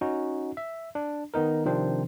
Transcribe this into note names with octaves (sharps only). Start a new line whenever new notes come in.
C#4 D#4 F#4
E5
D4
D#3 B3 D#4 A#4
C3 D#3 F3 C4 D4 C5